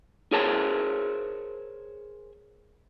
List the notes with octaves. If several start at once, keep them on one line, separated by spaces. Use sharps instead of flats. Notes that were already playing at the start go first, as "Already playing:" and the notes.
G#4 A#4 C5 C#5 A5